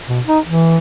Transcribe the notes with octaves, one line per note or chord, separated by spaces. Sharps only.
B2
D#4
E3